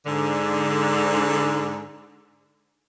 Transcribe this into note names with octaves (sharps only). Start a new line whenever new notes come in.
G#2 D3